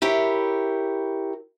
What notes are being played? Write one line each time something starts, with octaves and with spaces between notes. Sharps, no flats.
E4 G4 A#4 C#5